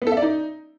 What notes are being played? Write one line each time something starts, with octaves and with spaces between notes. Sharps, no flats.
B3
A4
E5
D5
D#4